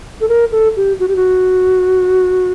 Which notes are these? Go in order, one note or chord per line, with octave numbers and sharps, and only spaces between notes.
A4
A#4
A4
G4
F#4
G4
F#4